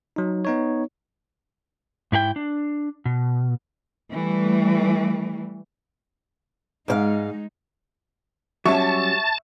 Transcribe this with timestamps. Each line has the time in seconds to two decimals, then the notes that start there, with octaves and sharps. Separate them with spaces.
0.16 F#3 D#4
0.45 B3 D#4 C#5
2.12 G#2 E4 G#4 G5
2.36 D4
3.05 B2
4.11 E3 G3 A3
6.88 G#2 G#3 D#4 C5 F5
8.66 F#3 G3 C#4 E5 A5 C#6 E7